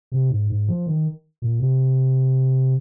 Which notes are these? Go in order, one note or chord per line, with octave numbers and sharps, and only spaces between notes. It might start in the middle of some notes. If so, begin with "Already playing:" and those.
C3
G#2
G#2
F3
D#3
A#2
C3